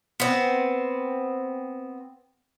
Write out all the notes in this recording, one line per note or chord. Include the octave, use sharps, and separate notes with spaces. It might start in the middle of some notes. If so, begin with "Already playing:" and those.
B3 C4